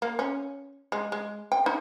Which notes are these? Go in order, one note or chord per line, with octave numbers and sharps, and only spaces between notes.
A#3
C#4
G#3
G#3
G5
D#4